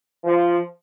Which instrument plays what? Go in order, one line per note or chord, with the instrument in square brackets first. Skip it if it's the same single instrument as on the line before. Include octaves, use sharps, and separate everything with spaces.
[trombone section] F3